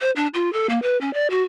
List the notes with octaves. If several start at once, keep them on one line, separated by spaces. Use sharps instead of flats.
C5
D4
F4
A4
A#3
B4
C#4
D5
F#4